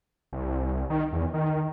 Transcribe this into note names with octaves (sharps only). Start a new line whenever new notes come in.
C2
D#3
E2
D#3